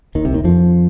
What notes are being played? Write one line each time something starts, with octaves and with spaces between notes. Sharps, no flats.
D#2 D#3
C2 C3
D#2 D#3
F2 F3